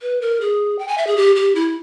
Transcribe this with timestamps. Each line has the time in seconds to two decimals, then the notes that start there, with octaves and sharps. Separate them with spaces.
0.02 B4
0.21 A#4
0.41 G#4
0.79 G5
0.88 G#5
0.98 E5
1.07 G#4
1.17 G4
1.36 G4
1.55 E4